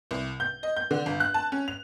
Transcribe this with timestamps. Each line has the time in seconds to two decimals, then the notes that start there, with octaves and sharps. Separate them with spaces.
0.11 C2
0.40 G6
0.63 D#5
0.77 G6
0.91 D3
1.06 G1
1.20 F#6
1.34 A5
1.52 C#4
1.68 F7